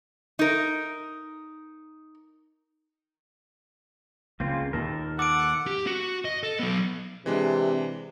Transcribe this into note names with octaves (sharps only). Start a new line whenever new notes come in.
D#4 A#4
C#2 C#3 A#3 C4 F4
D#2 A#2 D#3 A4 A#4
A4 F#5 D6 D7
G4
F#4
D#5
A4
F#3 B3
C3 E3 G#3 D4